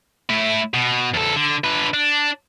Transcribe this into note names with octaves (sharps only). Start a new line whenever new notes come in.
A2 E4
B2
E2 A4
D3
D3 B4
D4